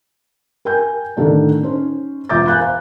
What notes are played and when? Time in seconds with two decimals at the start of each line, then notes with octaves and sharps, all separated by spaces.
0.65 A#4 G5 G#5 G6
1.17 A2 D3 D#3 A3 D4
1.63 C#4 D#4 C5
2.29 E1 F4 E5 D6 G6 A6
2.47 F5 G#5 A#5 F#6 G6 A6
2.61 C5